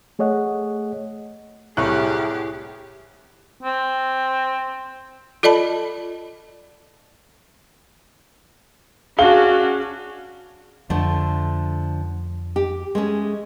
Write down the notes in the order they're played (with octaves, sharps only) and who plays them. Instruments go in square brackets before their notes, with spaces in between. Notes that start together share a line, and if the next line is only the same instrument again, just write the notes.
[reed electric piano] A3 G#4 C#5 D#5 F#5
[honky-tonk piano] C2 F#6 [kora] A2 A3 B4 [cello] G4 G#4
[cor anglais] C4
[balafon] F4 A4 D5 D#5 A5 B5
[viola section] C#4 D4 F#4 [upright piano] G#4 F5 G7
[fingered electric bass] F2 [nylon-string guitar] D3 F3 A3
[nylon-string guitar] G4
G#3 A3 C#4